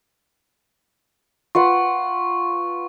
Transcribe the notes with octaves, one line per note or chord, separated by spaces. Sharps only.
F4 B4 F#5 C#6